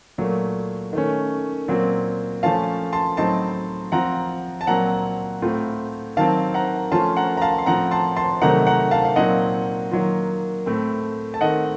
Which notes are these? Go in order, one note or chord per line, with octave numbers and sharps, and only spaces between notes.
A#2 F#3 A3
D#3 A3 C#4
A#2 F#3 C4
F3 A3 C#4 F4 F5 A5
A5 C6
A2 F#3 C4 D#4 A5 C6
F3 C4 F4 F#5 A#5
A5
A#2 F#3 C4 F#5 A#5
A2 A3 C4 F4
D#3 F#3 C4 F5 A5
F#5 A#5
F3 A3 C#4 F4 A5 C6
F#5 A#5
A#5
F5 A5
C6
A2 F3 C4 F#5 A#5
A5 C6
A5 C6
C3 D#3 F#3 A3 D#4 F#5 A#5
F#5 A#5
F5 A5
F5
A#2 F#3 C4 D#4 D#5 F#5
D#3 F#3 A#3 F4
A2 A3 C4
A5
D#3 A3 C4 D#5 F#5